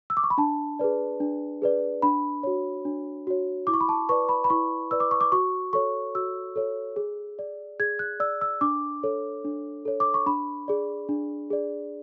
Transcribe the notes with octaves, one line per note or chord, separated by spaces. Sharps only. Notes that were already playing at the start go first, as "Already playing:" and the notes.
E6
D6
C#6
B5
D4 A5
G#4 B4 D5
D4
G#4 B4 D5
D4 B5
F#4 C#5
D4
F#4 C#5
E4 D6
C#6
B5
A5
B4 D5 C#6
B5
B5
E4 C#6
B4 D5 E6
D6
C#6
D6
F#4 C#6
A4 C#5 C#6
F#4 E6
A4 C#5
G#4
D5
G#4 G#6
F#6
D5 E6
E6
D4 D6
A4 C#5
D4
A4 C#5
D6
C#6
D4 B5
G#4 D5
D4
G#4 D5